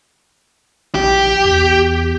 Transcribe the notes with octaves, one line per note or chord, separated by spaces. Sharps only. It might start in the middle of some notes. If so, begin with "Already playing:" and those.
A#1 G4
E2